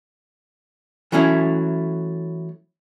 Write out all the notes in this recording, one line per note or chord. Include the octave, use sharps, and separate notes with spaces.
E3 F#3 A3 C#4 E4